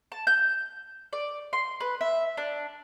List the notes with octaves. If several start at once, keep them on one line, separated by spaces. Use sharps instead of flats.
A5
G6
D5
C6
B4
E5
D4